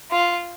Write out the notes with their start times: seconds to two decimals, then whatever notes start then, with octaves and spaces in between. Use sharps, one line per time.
0.11 F4